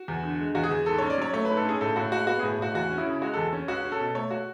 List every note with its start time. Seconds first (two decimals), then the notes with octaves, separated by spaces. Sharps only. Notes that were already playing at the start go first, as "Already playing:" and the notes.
Already playing: F#4
0.08 E2
0.23 D3
0.39 G#3
0.55 E2 F#4
0.63 G#4
0.71 E2
0.86 G#2 A4
0.98 C#4 C#5
1.10 D5
1.18 F#3 C#5
1.33 A3 C#5
1.45 G#2 B4
1.57 A4
1.65 C#4 G#4
1.81 A2 A4
1.96 A2 F#4
2.11 G#3 F#4
2.27 B3 F#4
2.40 A2 G#4
2.59 A2 F#4
2.74 E2 F#4
2.90 C#4
2.98 E4
3.06 C#3
3.21 G#3 F#4
3.34 E2 A4
3.53 C#4
3.68 C#2 F#4
3.85 C#4
3.92 A4
4.00 B2
4.15 A3 C#5
4.31 F#4